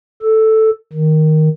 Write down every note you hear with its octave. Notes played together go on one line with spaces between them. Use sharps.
A4
D#3